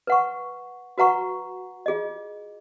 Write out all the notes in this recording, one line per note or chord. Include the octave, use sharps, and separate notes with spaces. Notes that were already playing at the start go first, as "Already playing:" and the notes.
B4 F#5 C#6
F#4 B4 F#5 A#5 C#6
F4 G#4 D#5